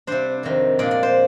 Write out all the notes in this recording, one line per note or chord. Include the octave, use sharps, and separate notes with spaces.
C3 G3 D4 C5
F2 C3 D#3
A#2 G#3 D4 D5
D5
C5